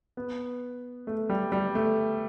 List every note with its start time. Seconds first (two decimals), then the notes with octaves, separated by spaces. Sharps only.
0.17 B3
1.07 A3
1.29 G3
1.52 G3
1.75 A3